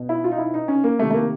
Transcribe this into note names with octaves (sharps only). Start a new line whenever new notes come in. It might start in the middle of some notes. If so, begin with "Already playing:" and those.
Already playing: B2
E4
F4
D#4
E4
D#4
C#4
A#3
C3 D#3 A3
A3
A#3